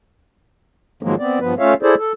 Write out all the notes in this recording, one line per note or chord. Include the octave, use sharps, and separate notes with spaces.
G#2 D#3 F3 F#3 G#3 A#3
B3 C4 D5
G2 F3 B3 B4
A3 C#4 F4 C#5 E5 F5
E4 G#4 A4 C5 D5
A4